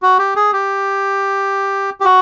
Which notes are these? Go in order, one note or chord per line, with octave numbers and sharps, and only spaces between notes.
F#4
G4
G#4
G4
G4
F#4